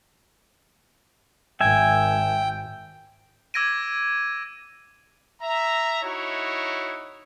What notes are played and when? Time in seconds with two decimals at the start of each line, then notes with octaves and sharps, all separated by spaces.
1.61 G#1 E5 G5 G#5
3.54 D6 E6 G#6 A#6 D7 D#7
5.42 E5 A#5
6.03 D#4 E4 F#4 C#5